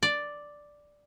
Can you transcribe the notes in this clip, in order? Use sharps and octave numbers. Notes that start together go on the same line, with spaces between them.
D5